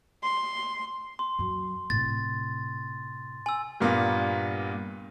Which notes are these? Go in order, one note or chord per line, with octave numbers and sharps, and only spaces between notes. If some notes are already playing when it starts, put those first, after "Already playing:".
C6
C6
F#2 F#3
A2 C3 A6
G#5 E6
G2 A#2 A#3 B3